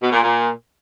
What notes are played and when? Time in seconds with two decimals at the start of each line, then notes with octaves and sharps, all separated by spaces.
0.02 B2
0.12 A#2
0.23 A#2